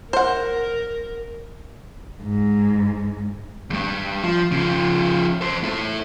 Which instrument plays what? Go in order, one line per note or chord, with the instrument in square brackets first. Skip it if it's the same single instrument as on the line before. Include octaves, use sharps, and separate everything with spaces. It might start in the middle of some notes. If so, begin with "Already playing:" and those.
[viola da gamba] A#4 [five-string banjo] C5 F#5
[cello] G#2
[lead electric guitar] E2 G2
F3
C#3 F3
A4 C5
E4 A4